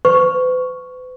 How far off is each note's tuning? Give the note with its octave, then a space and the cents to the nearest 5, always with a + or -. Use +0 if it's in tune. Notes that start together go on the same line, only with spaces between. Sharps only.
B4 +45 C#6 +0